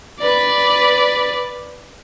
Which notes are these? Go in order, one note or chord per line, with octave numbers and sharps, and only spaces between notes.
B4 D5